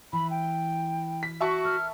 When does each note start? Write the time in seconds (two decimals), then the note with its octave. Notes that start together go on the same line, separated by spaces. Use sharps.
0.13 E3 B5
0.30 G5
1.23 B6
1.41 F#4 E5 A5 C#6
1.65 A#4 F6